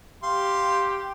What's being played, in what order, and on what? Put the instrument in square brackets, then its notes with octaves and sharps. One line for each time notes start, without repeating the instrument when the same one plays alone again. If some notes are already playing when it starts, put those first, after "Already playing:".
[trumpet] G4 [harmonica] F5 C6